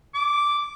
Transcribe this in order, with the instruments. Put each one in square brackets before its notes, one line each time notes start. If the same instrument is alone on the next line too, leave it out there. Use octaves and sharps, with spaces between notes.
[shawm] D6